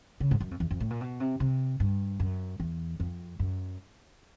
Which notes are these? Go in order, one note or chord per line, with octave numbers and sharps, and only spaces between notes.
C#3
G#2
F#2
F2
E2
F2
A2
A#2
B2
C3
C3
G2
F#2
E2
F2
F#2